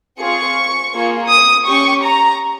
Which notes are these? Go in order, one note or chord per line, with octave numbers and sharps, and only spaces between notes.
C4 F4 G#4 C#6
A#3 F4 G#4
D#6
C#4 G4 C#6
A#5